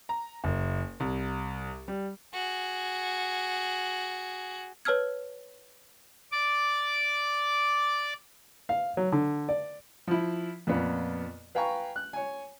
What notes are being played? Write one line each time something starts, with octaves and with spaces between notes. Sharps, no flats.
A#5
F#1
C2
G3
F#4 G#4
B4 C#5 A5 E6 F6 G#6
D5 D6
F5
F#3
D3
D5
F3 E4
F2 A#2 B3 F4
B4 F5 G5 G#5 A#5 C#6
F#6
C#5 G#5